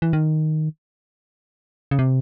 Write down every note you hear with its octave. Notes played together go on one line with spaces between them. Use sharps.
E3
D#3
C#3
C3